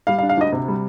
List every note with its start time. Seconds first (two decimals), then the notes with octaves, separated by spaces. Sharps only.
0.07 G3 F5
0.19 F5
0.23 D4
0.29 F5
0.37 D2 D#5
0.52 C3
0.68 G3